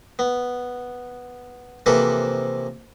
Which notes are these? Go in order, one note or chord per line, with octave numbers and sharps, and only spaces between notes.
B3
C3 E3 F3 A#3 A4 B4